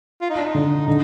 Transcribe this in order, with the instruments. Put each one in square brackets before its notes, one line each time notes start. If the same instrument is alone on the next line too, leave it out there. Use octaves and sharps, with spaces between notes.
[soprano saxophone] F4
D#4
D4
D#4
[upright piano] D3
[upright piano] D3 [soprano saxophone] D#4